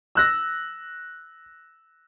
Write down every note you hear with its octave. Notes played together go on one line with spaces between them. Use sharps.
E6 F#6 A#6